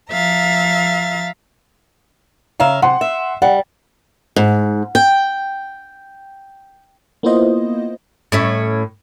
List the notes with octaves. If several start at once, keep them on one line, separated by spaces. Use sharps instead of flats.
F3 E5 F5 A#5 A6
C#3 E5 F5 A#5
C3 F#5 C6
E5
G3 F#5
G#2
G5
A#3 B3 E4 F4 C5 D#5
A2 C#4 E5